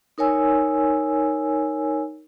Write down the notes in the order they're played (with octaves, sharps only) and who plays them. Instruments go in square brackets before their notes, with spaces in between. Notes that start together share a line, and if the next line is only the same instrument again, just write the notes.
[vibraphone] D#4 A#4 C#5 G#5 E6